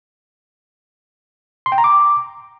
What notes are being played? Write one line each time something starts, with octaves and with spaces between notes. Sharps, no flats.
C6
G5
A#5
D6